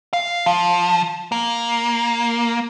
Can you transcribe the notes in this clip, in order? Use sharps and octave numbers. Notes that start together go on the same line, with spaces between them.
F5
F3
A#3